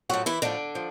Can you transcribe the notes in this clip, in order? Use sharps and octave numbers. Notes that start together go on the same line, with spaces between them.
A2 F3 F#3 F#4
E3 E4
A2 D3 F3 D4
F3